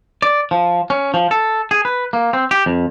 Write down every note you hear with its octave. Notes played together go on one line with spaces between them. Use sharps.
D5
F3
C#4
F3
A4
G#4
B4
A#3
C4
G4
F2